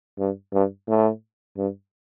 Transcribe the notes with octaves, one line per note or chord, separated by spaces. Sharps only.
G2
G2
A2
G2